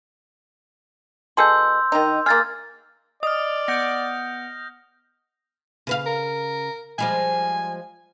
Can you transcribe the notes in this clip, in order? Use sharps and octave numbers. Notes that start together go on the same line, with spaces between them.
B2 G#4 A4 C6 E6 G6
D#3 D#4
A#3 G#4 F6 A6
D5 D#5 D#6 F6
B3 F#5 G6 A#6 D7
C#3 B4 F5
A#4
F3 G3 G#3 G#5